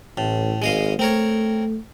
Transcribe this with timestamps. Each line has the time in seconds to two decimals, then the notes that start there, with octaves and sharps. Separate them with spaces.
0.17 A1 A2
0.62 G#1 G#3 D#5 F5
0.99 A3 C4 A#4 C#5